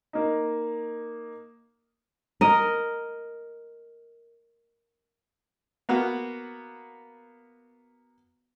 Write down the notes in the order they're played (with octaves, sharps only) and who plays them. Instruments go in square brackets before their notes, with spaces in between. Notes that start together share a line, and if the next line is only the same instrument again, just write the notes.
[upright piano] A#3 D#4
[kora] A#4 D#5
[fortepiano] A#3 B3 F#4